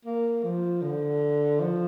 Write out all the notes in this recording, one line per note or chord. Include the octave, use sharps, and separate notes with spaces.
A#3
F3
D3
F3